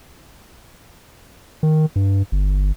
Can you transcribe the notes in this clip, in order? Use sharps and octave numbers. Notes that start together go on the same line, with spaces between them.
D#3
G2
G1